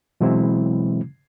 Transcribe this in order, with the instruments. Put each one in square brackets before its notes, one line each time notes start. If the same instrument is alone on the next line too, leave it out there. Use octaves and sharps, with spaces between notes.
[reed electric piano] B2 E3 F#3 G#3 C4 E4